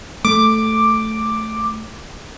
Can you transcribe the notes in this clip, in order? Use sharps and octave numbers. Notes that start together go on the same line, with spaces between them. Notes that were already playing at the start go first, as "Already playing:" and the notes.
A3 D6